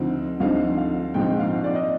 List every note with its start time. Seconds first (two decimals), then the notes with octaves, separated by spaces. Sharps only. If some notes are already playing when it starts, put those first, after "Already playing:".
Already playing: D2 D3 F3 C4 D#4
0.40 D2 D3 F3 C4 D#4 F5
0.77 F5
1.14 A#1 G#2 F3 C4 D#4 G5
1.39 F5
1.64 D5
1.75 D#5